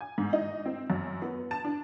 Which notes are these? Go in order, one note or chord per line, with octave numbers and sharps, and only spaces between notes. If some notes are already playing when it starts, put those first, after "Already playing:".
G#5
G#2
D#4
C4
F#2
B3
A5
D4